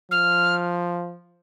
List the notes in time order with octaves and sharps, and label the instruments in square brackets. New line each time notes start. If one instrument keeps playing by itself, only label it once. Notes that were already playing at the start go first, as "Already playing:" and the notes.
[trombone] F3 [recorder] F6